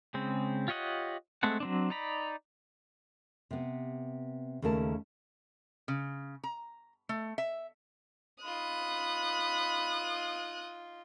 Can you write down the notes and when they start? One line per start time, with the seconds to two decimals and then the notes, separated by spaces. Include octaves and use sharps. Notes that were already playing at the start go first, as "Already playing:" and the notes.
0.14 C#3 G#3 C4
0.68 F4 G4 C#5 D#5 F#5
1.43 G#3 A3 C4 A4 F#5
1.60 F#3 C4 D4
1.90 D#4 D5 A#5 B5
3.51 C3 B3
4.62 D#2 C#3 A3 A#4 A5
5.88 C#3
6.44 A#5
7.09 A3
7.38 E5
8.44 D#4 F4 B5 D#6 F#6